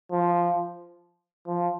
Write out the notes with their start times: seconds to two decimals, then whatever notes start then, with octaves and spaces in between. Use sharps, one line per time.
0.12 F3
1.47 F3